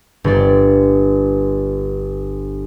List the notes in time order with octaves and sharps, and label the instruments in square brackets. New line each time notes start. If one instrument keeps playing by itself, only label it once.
[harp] G1 D5